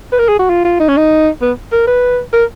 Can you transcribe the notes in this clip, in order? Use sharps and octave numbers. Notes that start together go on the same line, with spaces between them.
B4
A#4
G#4
F#4
F4
F4
D#4
C#4
D#4
B3
A#4
B4
A#4